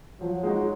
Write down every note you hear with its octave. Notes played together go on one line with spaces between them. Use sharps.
F3 F#3
G#3 D#4 F#4